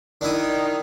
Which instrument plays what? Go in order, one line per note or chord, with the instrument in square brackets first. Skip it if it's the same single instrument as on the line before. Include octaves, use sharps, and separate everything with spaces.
[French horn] D#3 [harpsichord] D4 E4 D#6